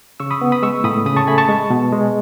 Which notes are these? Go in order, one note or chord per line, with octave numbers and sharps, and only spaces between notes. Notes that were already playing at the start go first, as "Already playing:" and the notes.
C#3 C#6 E6
B5 D#6
B3
B5 D#6
G#3 C#6 E6
A2 B5 D#6
C#3 B5 D#6
A5 C#6
A3 G#5 B5
A5 C#6
G#3
B2
G#3